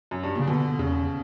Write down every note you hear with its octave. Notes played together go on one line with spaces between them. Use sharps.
F#2
G2
A#2 C#3
B2 D3
E2 C#3